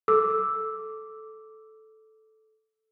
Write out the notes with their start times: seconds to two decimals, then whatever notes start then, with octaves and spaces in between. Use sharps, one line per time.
0.08 A4 D6 E6